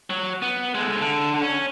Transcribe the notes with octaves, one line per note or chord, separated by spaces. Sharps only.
F#3
B3
G#3 A3
D3
C#4